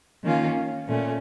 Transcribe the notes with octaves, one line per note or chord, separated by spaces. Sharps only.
D#3 A#3 C#4 F4
A#2 A3 C#4